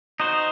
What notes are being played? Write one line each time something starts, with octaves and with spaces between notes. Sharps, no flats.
D#4 F#4 C5